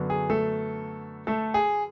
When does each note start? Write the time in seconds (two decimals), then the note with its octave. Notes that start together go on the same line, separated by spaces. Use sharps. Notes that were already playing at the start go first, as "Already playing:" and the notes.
Already playing: F#2 D3 F#3 B3
0.10 G#4
0.30 A3 A4
1.27 A3 A4
1.54 G#4